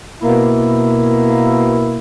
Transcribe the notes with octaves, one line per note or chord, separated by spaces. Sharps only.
B2 A#3 E4